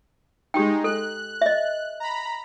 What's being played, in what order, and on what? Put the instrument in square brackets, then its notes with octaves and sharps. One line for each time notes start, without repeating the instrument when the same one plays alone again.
[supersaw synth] G#3 D#4 [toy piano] G4 G5
[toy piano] A4 [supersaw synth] F#6
[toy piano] D#5 E5
[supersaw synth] A#5 B5